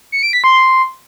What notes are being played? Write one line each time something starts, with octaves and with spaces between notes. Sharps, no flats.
C#7
D7
B6
C6